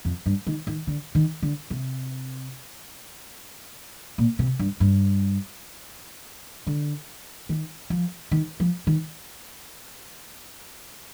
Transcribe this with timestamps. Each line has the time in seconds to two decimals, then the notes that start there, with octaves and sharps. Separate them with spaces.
0.05 F2
0.26 G2
0.47 D#3
0.67 D#3
0.87 D3
1.15 D#3
1.43 D3
1.70 C3
4.18 A#2
4.39 C3
4.59 G2
4.80 G2
6.67 D3
7.49 D#3
7.90 F3
8.31 D#3
8.60 F3
8.87 D#3